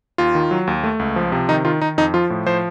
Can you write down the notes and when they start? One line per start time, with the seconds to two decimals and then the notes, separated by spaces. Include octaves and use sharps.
0.18 D#2 F4
0.35 D#3
0.51 F#3
0.67 D#2
0.83 A3
0.99 C#2
1.16 F3
1.32 C3
1.49 D#3 D#4
1.65 D#3 F4
1.81 D#3 D#4
1.98 F2 D#4
2.14 F3 F4
2.30 A2
2.46 F3 C5